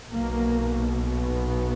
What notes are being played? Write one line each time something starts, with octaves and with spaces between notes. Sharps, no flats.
B1 B2 A#3
B3